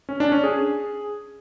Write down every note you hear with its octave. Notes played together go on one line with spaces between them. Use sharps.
C#4
D4
C#4
G#4